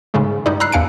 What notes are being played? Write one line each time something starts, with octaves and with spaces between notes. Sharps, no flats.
G#2 C#3 G#3 A3
G2 D#4 E4 D5
A#5 B5 E6 F#6 C7
E2 D4 F5 G#5 C#7 D7